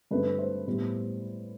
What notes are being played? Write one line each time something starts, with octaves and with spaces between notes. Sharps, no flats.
G2 D3 A3 C4 B4
C5
A2 G3 B3